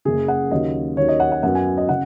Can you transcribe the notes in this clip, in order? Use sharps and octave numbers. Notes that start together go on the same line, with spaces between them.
F#1 F#2 C#3 G#4
F#5
D#2 C#3 F#3 C#4 D#5
D#2 D#3 F#3 C#4 C#5
D#5
F#5
F#5
F#2 F#3 B3 F#5
G#5
D#5
C#3 F#5